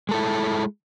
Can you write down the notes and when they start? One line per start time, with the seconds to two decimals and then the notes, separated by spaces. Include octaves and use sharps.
0.09 G#3
0.11 A4
0.14 E4